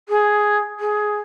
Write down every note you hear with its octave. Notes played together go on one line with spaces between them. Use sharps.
G#4
G#4